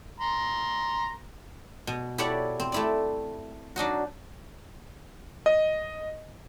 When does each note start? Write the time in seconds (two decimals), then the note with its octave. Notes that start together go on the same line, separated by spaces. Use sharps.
0.20 A#5 C6
1.87 B2
2.18 E4 G4 A4 C#5 D5 F#5
2.60 C4
2.72 A3 E4 D5
3.76 F#3 D4 D#4 F#4
5.46 D#5